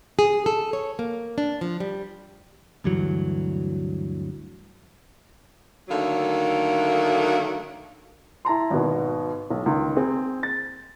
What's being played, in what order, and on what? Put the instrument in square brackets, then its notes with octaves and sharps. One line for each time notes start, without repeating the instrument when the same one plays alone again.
[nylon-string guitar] G#4
A4
C#5
A#3
D4
F3
G3
[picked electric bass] D2 G2 E3 F#3
[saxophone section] D3 D#3 F#3 A3 A#3
[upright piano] E4 A5 A#5 C6
G#1 B2
B1
C#2 D#3
C4 G#4
A6